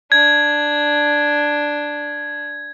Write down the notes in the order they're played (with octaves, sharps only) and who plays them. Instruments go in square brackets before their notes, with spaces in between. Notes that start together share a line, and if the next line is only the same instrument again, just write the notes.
[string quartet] D4 [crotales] G#6